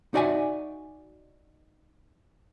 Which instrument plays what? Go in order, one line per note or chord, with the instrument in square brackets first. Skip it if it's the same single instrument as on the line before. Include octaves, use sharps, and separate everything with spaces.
[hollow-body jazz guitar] D#4 F#4 D5 E5 G#5